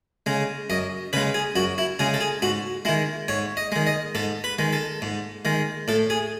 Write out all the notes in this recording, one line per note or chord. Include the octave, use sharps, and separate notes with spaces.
C#3 G#3
F#2 D#5
C#3 G#3 B4
G#4
F#2 F#4
E4
C#3 G#3 G#4
A4
G#4
G#2 F#4
D#3 G#3 E4
G#2 C#5
D#5
D#3 G#3
D#5
G#2 A4
B4
D#3 G#3
A4
G#2
D#3 G#3
A2 A4
G#4